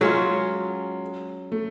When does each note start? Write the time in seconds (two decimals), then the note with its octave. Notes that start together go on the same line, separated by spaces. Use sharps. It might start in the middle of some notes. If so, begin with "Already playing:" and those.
0.01 F#3 G#3 C#4 F4
1.52 A3